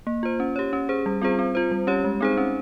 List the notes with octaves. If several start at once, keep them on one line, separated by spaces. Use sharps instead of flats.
A#3
F4 C5
C#4
G4 C#5
C#4
G#4 C5
G3
C4 F4 G#4 C5
C4
F4 C5
G3
C#4 G4 C#5
G#3
C4 D#4 G#4 C5
C#4